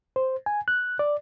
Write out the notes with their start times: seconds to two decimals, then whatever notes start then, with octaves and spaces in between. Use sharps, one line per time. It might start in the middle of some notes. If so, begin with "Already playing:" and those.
0.16 C5
0.46 G#5
0.68 F#6
0.99 D5